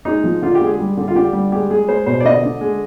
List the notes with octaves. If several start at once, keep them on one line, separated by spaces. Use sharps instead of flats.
G#3 D#4
F3
D3 F4
G4
G#3
G#4
G3
D3
F4
D3 G4
G3
G#3 G4
G#3 G#4
G#3 C5
B2 C5
D5
D3 D#5
D3
G#3